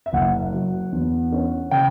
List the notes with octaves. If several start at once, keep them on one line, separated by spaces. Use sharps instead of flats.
E5
F#1 F#5
F#3
E2
C#4
C#3 G5